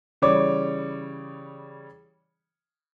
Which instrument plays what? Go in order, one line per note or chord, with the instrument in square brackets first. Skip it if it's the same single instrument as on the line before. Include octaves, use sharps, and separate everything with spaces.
[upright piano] C#3 E3 G3 C#5 D6